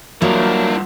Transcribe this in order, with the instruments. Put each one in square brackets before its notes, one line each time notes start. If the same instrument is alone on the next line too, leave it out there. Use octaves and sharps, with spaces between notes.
[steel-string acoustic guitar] F#3 [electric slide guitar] G3 F4 [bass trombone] A#3 [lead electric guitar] D4 E4